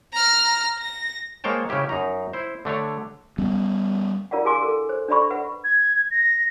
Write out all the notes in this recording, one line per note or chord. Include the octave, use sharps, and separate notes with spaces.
A#5 F6
A#6
G#3 A#3 C5 C#5 G5 A5
C#3 C#4 E4 G4 E5
F#2 D#4 A#5
E4 C5
D3 A3 D4 C#5
G3 B3 C#4
D4 E4 A#4 D5 F5 F#5
G#4 A#4 F5 G#5 C6 D6
A4 A#4
C5
D4 A4 D5 E5 B5 C#6
B4 E5 F#5
G#6
A#6